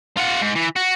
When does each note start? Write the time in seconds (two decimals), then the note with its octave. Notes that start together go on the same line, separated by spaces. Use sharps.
0.17 F4 F#5
0.42 G#2
0.56 E3
0.76 F#4